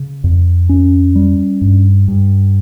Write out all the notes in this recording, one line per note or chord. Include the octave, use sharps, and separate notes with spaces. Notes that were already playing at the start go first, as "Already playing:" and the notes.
Already playing: C#3
F2
C#4
G3
G2
G2